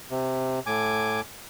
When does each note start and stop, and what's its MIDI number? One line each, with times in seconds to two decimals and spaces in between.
0.10 0.60 48
0.66 1.21 45
0.66 1.21 80
0.66 1.21 86